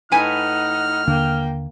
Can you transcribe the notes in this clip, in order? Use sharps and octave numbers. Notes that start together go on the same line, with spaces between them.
A2 D#4 B4 F#5 G#5 F6
D#2 D3 A#3 D4 G5